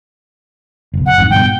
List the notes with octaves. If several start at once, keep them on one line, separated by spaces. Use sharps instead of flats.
F#1 B1
F#5
G#1 F2 G#2
G2 B2 G5